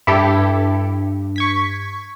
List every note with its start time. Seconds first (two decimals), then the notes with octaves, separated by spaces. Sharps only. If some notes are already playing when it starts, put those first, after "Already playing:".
0.07 G2 E4 G4 A4
1.36 C#6 G#6 B6